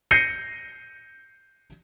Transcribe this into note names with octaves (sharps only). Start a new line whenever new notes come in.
G6 A#6 C7 C#7 D#7